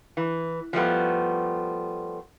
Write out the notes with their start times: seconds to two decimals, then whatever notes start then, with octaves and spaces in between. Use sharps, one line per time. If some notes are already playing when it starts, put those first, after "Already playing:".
0.17 E3
0.73 F3 G3 A3 B3